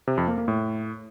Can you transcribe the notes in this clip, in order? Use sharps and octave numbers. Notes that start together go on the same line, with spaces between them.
C3
F2
A#3
A#3
A2